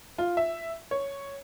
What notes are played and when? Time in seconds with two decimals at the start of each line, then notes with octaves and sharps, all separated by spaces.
0.18 F4
0.37 E5
0.91 C#5